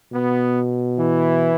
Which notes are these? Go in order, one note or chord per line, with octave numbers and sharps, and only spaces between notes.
B2 B3
E3 E4